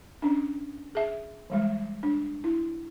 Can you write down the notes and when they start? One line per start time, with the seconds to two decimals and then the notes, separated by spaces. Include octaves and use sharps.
0.22 C#4 D4
0.95 G#4 E5
1.50 E3 G3 G#3
2.03 D4
2.44 E4